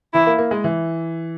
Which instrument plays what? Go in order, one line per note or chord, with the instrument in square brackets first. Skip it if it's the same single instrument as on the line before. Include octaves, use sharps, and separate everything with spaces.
[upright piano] E3 [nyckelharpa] E4
[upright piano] A#3
A#3
G#3
E3